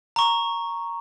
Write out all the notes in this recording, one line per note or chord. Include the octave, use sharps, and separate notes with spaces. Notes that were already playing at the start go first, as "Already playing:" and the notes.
A#5 C#6